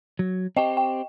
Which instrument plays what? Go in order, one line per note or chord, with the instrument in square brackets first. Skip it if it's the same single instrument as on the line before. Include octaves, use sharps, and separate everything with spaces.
[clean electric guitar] F#3
[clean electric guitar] C4 G4 [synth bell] D#5 G5
[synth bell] G5